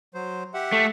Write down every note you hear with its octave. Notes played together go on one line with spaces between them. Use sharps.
F#3 C5
G4 E5 F#5
A3